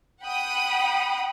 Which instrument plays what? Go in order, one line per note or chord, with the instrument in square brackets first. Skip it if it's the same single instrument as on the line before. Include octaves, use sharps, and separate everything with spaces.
[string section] F#5 G5 B5 D#6